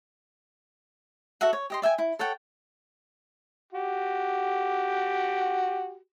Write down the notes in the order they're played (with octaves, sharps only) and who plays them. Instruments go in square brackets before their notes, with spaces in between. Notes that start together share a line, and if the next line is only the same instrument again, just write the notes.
[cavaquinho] F#4 A4 E5 F#5
C#5
G4 D#5 C6
D5 E5 G5 G#5
E4
A4 C#5 F#5 G5
[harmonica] F#4 G4